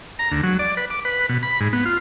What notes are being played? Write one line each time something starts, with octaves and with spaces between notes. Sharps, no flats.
A#5
D2
F#3
D5
B4
D6
B4
B2
B5
G#2
B3
F4